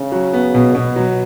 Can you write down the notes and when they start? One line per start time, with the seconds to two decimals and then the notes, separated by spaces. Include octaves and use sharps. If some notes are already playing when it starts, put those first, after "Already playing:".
Already playing: C#3
0.12 F#3
0.33 B3
0.55 B2
0.75 B2 B3
0.96 F#3